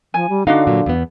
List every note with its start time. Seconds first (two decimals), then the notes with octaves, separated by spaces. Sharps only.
0.14 F3 G#5
0.29 G3
0.47 D3 D4 D#4 F#4 F5
0.67 A#2 F#3
0.86 E2 B3